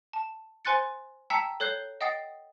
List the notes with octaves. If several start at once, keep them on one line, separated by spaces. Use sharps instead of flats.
A5
C5 G#5 C6 F#6 A6 C#7
G5 A5 A#5 E6 B6 C#7
A4 C#5 F#6 G6 C7 G7
D#5 F#5 G5 D#6 A6 C7